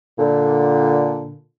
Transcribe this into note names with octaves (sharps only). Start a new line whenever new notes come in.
A#2 D3